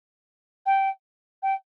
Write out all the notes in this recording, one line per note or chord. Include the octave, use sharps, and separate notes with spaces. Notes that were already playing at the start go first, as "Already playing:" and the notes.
G5
G5